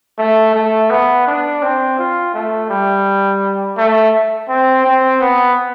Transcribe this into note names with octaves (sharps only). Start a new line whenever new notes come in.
A3
A3
B3
D4
C4
F4
A3
G3
A3
C4
C4
B3